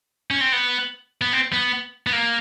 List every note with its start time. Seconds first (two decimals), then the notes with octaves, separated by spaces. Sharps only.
0.31 C#4
0.41 C4
0.52 B3
1.21 B3
1.33 C4
1.53 B3
2.07 B3
2.13 A#3